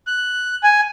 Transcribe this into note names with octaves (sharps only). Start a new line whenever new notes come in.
F#6
G#5